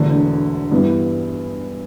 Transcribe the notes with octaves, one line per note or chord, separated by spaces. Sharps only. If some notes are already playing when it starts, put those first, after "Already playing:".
Already playing: E1 E2 D3 A3
G2 E3 B3